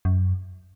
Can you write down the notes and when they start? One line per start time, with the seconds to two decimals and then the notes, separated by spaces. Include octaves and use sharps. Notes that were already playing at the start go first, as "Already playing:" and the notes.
0.05 F#2